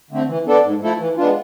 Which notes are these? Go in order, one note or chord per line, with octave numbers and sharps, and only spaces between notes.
D3 A3 C4
E3
B3 D4 A4 D5
G#2
F3 A3 E4 A4
E3
G#3 B3 D4 F4